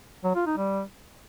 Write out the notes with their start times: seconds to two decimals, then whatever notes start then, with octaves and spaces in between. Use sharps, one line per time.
0.24 F#3
0.35 F4
0.46 D#4
0.57 G3